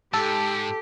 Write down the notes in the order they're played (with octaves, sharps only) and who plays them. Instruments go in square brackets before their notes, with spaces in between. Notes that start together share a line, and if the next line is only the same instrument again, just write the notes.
[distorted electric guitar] G#2 [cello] G4 [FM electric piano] A4